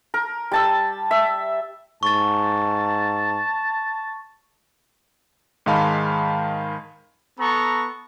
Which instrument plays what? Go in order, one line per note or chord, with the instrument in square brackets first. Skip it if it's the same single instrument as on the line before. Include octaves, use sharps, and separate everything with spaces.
[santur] A#4
G3 A5 E6
E5
[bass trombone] G#2 [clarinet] A5 [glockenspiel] C#6 A6
[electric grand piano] G#2 D#3 G#3 F5 A5 B5
[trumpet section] B3 A4 A#5 C#6